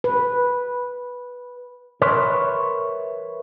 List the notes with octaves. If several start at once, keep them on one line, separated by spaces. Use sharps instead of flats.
B4
A#4 B4 C#5 E5 C6